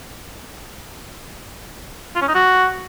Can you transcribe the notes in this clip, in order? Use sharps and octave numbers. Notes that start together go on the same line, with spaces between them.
F4
C#4
D#4
F#4